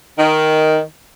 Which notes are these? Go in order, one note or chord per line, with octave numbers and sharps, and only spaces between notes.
D#3